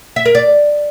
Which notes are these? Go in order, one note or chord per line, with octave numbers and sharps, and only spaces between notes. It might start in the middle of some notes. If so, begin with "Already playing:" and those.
E5
A#4
D5